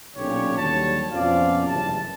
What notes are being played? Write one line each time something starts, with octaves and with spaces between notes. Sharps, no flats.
B1 A#2 D3 C#4 G4 C#5
D#2 D3 F#3 G3 C#5 A5
F2 B2 F3 C#4 D5 F5
F#1 G2 C3 E3 A5